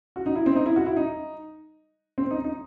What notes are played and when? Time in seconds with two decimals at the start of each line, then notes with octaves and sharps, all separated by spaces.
0.16 F#4
0.26 D#4
0.36 E4
0.46 C4
0.56 D#4
0.66 E4
0.76 F#4
0.86 E4
0.96 D#4
2.18 C4
2.31 D#4
2.44 D#4